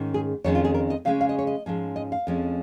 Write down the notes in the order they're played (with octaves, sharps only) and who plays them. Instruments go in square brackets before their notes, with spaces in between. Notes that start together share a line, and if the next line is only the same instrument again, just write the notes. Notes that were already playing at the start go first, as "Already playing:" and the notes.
Already playing: [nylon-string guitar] G#2 D#3 C#4
G#4
F2 D#3 G#3 C#4 C#5
F4
G#4
A#4
D#5
C#3 G#3 C#4 F5
F5
D#5
C#5
D#5
G#2 F3 C#4
D#5
F5
F2 F3 G#3 C#4